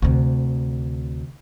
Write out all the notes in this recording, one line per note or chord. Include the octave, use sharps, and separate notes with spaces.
D2 C3